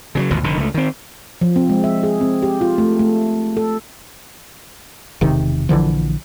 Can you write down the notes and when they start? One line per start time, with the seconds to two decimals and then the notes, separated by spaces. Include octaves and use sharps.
0.15 C#3 F3 F#3
0.30 G#1 D2 B2 F3
0.44 F1 D3 D#3
0.57 C#2 A3
0.74 D#3 C4
1.41 F3
1.56 C4
1.69 G#3
1.84 E5
2.03 G#4
2.21 C4
2.42 G4
2.61 F4
2.78 A3
2.99 A3
3.57 A4
5.21 E1 C3 D#3
5.69 A#1 D3 E3 F3